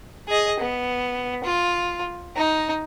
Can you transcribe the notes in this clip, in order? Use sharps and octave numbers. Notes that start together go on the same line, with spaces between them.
G#4 D#5
B3
F4
D#4